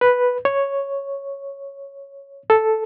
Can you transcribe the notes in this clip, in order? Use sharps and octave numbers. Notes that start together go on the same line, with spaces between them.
B4
C#5
A4